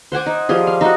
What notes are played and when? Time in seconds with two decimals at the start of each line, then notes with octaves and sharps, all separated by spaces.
0.12 C5 F#5 G#5 D6
0.26 D#4
0.49 F3 G3 G#4
0.67 F5
0.81 D#4 F#4